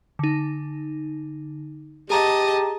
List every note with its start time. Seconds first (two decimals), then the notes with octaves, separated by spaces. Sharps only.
0.19 D3 D#4
2.10 G4 G#4 D#5 A5 A#5